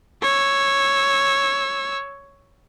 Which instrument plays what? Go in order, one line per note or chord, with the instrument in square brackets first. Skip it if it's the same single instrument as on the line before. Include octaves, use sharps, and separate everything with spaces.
[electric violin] C#5 E6